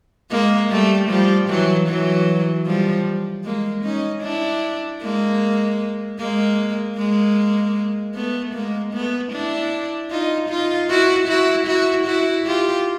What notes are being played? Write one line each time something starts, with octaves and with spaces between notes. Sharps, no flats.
G#3 A#3
G3 A3
F3 G3
E3 F#3
E3 F#3
F3 G3
G#3 A#3
C#4 D#4
D4 E4
G#3 A#3
G#3 A#3
G#3 A#3
A3 B3
G#3 A#3
A3 B3
D4 E4
D#4 F4
D#4 F4
E4 F#4
E4 F#4
E4 F#4
E4 F#4
F4 G4